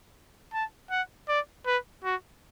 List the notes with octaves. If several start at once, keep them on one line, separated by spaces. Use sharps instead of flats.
A5
F#5
D5
B4
F#4